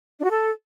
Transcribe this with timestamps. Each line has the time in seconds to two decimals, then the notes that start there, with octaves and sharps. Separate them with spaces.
0.19 D4
0.24 F#4
0.30 A4